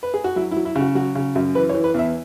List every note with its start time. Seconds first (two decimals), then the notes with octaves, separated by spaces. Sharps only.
0.03 B4
0.14 G#4
0.24 F#4
0.36 F#3 E4
0.51 E4
0.56 F#3
0.65 E4
0.76 C#3 F#4
0.95 F#3 F#4
1.15 C#3
1.36 F#2
1.55 E3 B4
1.69 C#5
1.74 E3
1.84 B4
1.94 E2 E5